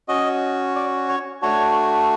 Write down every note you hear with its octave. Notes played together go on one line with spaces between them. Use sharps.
C#4 F#4 D#5
D5
C#5
A3 D4 F#4 C#5